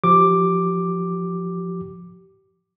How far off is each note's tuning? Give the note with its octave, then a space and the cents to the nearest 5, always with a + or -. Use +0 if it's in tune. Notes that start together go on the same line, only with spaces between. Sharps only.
F3 +5 G4 -25 D6 +5